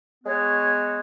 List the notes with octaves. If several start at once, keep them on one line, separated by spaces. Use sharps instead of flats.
G#3 B3 F#4 C#5